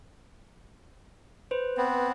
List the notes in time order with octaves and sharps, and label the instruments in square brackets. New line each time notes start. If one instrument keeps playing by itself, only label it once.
[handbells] B4 C5
[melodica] B3 C4